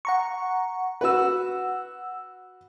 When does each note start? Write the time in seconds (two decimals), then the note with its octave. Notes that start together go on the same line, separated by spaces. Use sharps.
0.05 F#5 A#5 C#6
1.01 F#4 B4 F#5 E6